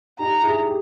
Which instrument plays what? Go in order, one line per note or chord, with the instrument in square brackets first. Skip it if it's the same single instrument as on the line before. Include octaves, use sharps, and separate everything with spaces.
[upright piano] D#4 G4 [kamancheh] A#5
[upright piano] E4 G#4
G4